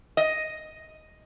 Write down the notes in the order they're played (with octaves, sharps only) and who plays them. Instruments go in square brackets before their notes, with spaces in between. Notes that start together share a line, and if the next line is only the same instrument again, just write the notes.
[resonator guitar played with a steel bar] D#5